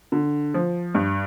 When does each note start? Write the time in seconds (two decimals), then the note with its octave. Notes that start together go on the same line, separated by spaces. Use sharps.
0.12 D3
0.54 F3
0.95 G2